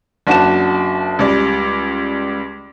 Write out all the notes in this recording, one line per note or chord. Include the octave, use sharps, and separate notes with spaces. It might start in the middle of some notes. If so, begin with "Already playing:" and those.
F#1 D4 F#4 A5 E7
C#2 G3 D5